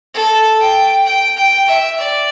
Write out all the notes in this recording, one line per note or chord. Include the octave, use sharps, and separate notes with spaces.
A4
G5
G5
G5
E5
D5